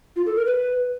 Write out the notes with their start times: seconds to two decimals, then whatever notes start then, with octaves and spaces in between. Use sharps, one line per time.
0.16 F4
0.26 A4
0.36 A#4
0.46 B4